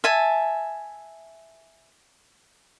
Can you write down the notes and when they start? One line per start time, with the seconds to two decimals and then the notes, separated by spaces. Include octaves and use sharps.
0.04 E5 G#5 A5